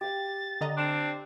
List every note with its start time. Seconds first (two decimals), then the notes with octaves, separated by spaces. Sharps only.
0.01 G4 F5 A6
0.61 D3 D#5 A#5
0.76 C4 D4